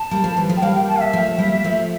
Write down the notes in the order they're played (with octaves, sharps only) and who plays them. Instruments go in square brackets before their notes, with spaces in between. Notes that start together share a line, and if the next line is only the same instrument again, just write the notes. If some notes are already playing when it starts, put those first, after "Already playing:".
Already playing: [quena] A5
[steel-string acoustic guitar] G3 A#3
F3 A3
E3 G3
F3 A3
[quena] G5
[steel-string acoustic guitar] G3 A#3 [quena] F5
[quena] G5
A5
F5
E5
[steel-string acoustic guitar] F3 A3
G3 A#3
F3 A3